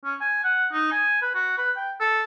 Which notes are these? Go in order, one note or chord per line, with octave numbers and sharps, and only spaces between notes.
C#4
G#5
F#5
D#4
G#5
B4
F#4
B4
G5
A4